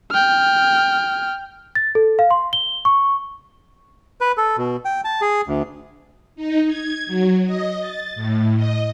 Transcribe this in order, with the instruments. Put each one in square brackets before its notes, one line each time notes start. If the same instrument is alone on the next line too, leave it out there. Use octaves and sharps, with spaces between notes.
[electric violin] G5 F6
[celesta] A6
A4
F5
C6
G7
C#6
[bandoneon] B4
A4
B2
G5
A5
G#4
D2
[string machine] D#4
G#6
F#3
D#5
A6
A2
D#5